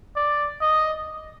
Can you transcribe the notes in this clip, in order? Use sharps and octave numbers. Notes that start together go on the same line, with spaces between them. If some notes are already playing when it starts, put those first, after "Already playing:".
D5
D#5